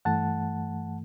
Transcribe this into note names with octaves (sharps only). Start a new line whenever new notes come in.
G2 E3 A3 F#5 A5